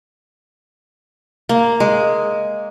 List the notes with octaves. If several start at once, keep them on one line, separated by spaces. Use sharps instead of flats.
A#3
G#3